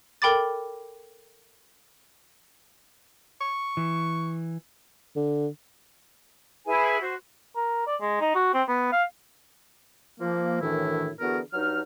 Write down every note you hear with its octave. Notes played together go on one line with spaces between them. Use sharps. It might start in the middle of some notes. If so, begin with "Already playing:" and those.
A4 A#4 G5 B5 D6 A6
C#6
E3
D3
E4 G#4 B4 G#5
F#4 C5
A#4
D5
G#3
D#4
F#4
C4
B3
F5
F3 A#3
F#2 A2 D#3 E3 D4 E4
D3 E3 B3 F#4 G#4 A#4
G2 F#3 D#4 F6